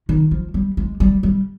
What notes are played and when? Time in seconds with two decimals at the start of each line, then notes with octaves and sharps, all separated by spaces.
0.09 D#3
0.31 F3
0.54 G3
0.77 G#3
1.00 G3
1.23 G3